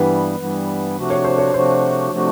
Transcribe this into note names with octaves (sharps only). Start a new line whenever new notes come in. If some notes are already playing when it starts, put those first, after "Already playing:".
Already playing: G2 E3 G3 B3 B4
G2 E3 G3 B3
C3 F3 A3 D4 F#4
C#5
C5
C#5
C3 F3 A3 D4 F#4 C5
C3 F3 A3 D4 F#4